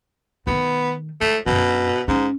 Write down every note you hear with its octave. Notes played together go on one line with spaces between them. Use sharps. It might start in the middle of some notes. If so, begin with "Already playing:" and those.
D#3 A3 B3
G#3 A3
F#2 B2 D4
G#2 C#4